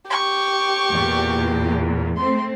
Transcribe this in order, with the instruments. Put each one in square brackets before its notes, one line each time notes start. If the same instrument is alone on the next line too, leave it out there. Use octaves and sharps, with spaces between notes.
[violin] G4 [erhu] C#6
[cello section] E2 A#2
[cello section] A3 C4 [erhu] C6